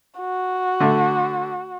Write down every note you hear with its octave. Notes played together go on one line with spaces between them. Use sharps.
F#4
D3 A3